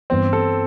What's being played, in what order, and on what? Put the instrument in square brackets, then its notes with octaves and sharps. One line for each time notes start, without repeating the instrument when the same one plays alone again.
[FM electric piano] G2 E3 B3 D4 [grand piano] C4
[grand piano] A4